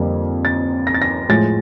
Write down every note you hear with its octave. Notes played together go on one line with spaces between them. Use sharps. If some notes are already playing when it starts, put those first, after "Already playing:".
Already playing: F2 D3 G3 A#3
A6
A#6
A6
A#6
A2 F3 G#3 A6